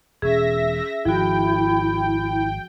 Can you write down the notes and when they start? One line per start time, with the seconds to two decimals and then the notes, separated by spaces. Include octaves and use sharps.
0.22 E1 B2 C#4 G#4 E5 A#6
1.05 G#1 F3 E4 F#4 G5